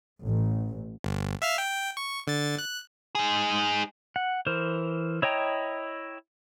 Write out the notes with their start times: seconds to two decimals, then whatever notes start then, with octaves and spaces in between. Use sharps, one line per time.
0.24 A1
1.04 G1
1.42 E5 F5 F6
1.58 G5
1.97 C#6
2.27 D3 A6
2.58 F#6
3.15 D#4 G#4
4.16 F#5
4.47 E3 A#4 C5
5.22 E4 C#5 D#5 G5 A#5